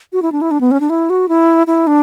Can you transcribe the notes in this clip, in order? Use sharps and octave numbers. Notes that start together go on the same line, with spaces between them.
F#4
E4
D4
E4
D4
B3
C#4
D4
E4
F#4
E4
E4
D4